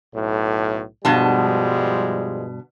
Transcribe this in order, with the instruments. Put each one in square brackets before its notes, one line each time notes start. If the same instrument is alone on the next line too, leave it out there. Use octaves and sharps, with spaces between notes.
[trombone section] B1 A2
[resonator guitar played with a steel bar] G2 B2 A5 [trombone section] F3 G3 G#3